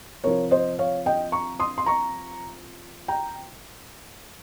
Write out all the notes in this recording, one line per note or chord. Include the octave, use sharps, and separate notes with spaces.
C3 F3 A#4 C#5
C5 D#5
C#5 F5
D#5 G5
A#5 C#6
C6 D#6
C6
A#5 C#6
G5 A#5